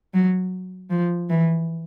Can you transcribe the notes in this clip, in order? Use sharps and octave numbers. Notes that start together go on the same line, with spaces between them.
F#3
F3
E3